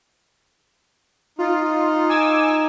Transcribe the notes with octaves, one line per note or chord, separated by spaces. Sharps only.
D#4 F4
G#5 D6 E6